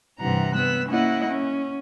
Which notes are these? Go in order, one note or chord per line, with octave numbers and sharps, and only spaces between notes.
G2 C3 E3 F#5 A#5
B3 E6 F#6
A#3 C#4 E4 D#5 F#5
C#4